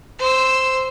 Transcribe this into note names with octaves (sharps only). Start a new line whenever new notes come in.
C5 E6